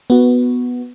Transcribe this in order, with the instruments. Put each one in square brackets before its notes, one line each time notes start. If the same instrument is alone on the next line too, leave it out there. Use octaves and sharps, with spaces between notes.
[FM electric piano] B3 F#4